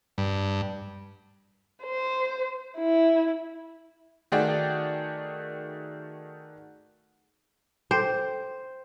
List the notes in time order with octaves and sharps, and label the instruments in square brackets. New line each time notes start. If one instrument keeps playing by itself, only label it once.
[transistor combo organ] G2
[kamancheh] C5
E4
[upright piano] D#3 A3 F#4 G#4 D5 G5
[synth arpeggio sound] A4 G5 D6 [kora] C5